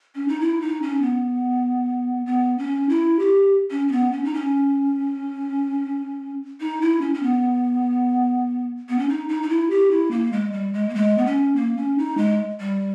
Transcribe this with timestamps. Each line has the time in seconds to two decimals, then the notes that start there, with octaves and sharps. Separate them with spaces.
0.15 C#4
0.28 D#4
0.40 E4
0.61 D#4
0.82 C#4
1.02 B3
2.26 B3
2.58 C#4
2.89 E4
3.19 G4
3.71 C#4
3.88 C#4
3.92 B3
4.12 C#4
4.24 D#4
4.34 C#4
6.61 D#4
6.81 E4
7.01 C#4
7.14 C#4
7.23 B3
8.89 B3
8.98 C#4
9.09 D#4
9.29 D#4
9.43 D#4
9.49 E4
9.70 G4
9.91 E4
10.11 A#3
10.32 G#3
10.52 G3
10.73 G#3
10.89 A#3
10.95 G#3
11.18 B3
11.26 C#4
11.56 A#3
11.77 C#4
11.98 D#4
12.18 G#3
12.60 G3